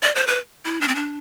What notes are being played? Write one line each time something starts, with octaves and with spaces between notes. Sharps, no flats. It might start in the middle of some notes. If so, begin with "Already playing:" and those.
D5
C5
B4
E4
D4
C4
D4